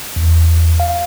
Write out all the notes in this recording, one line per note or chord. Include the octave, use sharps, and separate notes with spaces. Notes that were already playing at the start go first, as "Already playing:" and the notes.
E2
F5